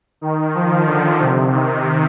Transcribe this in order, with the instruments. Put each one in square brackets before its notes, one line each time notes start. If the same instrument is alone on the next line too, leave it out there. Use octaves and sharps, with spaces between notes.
[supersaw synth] D#3
F3
D3
C3
D#3